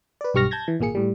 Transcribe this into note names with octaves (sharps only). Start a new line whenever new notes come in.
B4 D5
B1 G2 G4 C#6 F6 A#6
A5 G6 G#6 A#6
E3
G#1 A#2 A#3 G#4 C#7
A2 G3